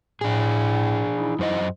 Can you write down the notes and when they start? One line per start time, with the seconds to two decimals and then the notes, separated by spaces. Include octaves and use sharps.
0.21 A2 D4 G#4
1.16 E3 D#4 E4
1.39 F#2 C5 D#5